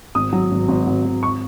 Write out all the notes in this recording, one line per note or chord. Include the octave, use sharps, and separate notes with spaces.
G#1 D#6
F#3
G#1
G#1
G#1
G#1
C#6